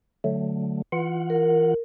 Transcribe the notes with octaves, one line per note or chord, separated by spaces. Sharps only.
D3 F#3 A3
E3 F4 F#5
A#4